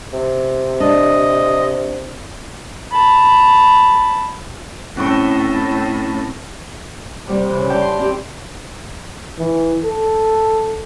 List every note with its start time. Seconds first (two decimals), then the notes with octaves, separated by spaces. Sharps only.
0.13 C3
0.80 D4 D#5
2.91 A5 B5
4.97 A2 C4 C#4 C#6
7.27 C3 G3 C4
7.45 C3 E3
7.57 C#3
7.70 G2 G4 G5 A5
7.82 C6
7.99 C4 G4
9.38 E3
9.84 A4